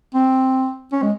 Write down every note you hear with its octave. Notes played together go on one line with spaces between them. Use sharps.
C4
C#4
G#3